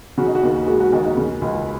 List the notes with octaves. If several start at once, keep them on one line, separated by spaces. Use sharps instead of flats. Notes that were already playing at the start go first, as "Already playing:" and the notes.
C#3 F#4
D#4
F#4
D#2
G#3 F#4
F#4
D#2 D#4
D#4
C#3
C#2